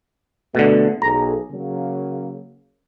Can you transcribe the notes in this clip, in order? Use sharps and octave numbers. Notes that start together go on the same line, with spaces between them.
B2 D3 A3
B1 G#4 A4 A#5
C#3 F#3 A#3